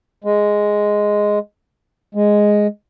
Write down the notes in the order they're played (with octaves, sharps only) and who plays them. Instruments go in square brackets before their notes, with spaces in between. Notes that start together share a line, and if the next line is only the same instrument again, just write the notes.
[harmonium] G#3
G#3